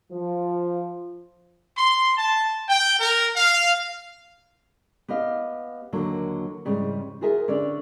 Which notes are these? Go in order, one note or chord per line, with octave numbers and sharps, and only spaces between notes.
F3
C6
A5
G5
A#4
F5
B3 G4 D#5 F5
D#2 D3 F#3 A#3
F2 G#2 C#3 G3
F4 F#4 G#4 A#4 E5
D3 C#4 D5